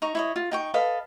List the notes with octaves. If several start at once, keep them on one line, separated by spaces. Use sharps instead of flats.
D#4 A#5 C#6
E4 C#5 D#5
F4
D#4 G5 C#6
A4 B4 D#5 F5